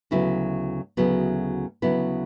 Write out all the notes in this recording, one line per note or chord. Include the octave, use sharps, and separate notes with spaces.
D2 C#3 F#3 B3 E4
D2 C#3 F#3 B3 E4
D2 C#3 F#3 B3 E4